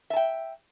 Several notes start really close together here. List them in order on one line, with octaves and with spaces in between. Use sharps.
E5 A5 G5